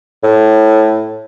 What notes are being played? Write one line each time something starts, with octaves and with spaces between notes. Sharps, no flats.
A2